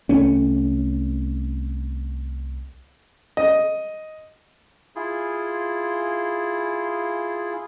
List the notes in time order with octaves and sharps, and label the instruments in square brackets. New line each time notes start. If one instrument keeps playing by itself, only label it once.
[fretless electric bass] C2 A3 C#4
[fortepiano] D#5
[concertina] E4 F4 G#4